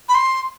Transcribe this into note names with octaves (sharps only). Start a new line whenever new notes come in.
B5
C6